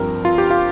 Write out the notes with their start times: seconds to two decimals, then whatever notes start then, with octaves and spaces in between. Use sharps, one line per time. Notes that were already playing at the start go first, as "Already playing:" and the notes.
Already playing: G2 F3 C4 A#4
0.25 F4
0.38 G4
0.51 F4